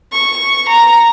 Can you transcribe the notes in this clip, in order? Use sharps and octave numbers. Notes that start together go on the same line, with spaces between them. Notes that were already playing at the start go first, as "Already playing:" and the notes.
C#6
A#5